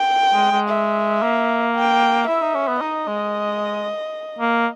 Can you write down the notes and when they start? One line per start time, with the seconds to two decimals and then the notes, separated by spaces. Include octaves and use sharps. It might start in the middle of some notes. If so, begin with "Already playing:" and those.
Already playing: G5
0.34 G#3
0.51 G#3
0.69 E5
1.22 A#3
1.75 G5
2.27 E4 E5
2.42 D#4
2.55 C#4
2.68 B3
2.80 D#4 D#5
3.07 G#3
4.39 A#3